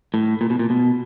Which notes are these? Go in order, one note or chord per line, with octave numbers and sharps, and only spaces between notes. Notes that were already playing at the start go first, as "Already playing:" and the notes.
A2
A#2
B2
A#2
B2